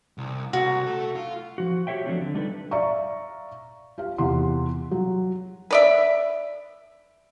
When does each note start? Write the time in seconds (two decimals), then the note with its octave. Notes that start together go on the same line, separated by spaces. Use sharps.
0.18 C2
0.53 C2 F#4
0.87 A3 A4
1.15 F4
1.58 F3 F#4
1.87 F#4 G4 B4 C#5 E5 G5
2.05 F3 F#3 A3 C4 D4 F4
2.21 D3
2.35 G3 D4 D#4 A4 B4
2.71 D5 E5 F5 A#5 C#6
3.98 F4 G4 F5
4.18 E2 C3 E4 G4 F#5 C6
4.91 F#3
5.71 B4 D5 E5